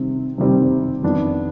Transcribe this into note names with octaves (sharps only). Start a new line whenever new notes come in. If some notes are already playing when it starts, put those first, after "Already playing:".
Already playing: C3 D#3 G3 C4
C3 D#3 G3 C4
F2 D#3 B3 D4